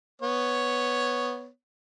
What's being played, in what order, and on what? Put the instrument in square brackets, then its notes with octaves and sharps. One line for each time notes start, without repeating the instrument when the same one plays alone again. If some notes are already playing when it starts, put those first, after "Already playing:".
[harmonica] B3 C#5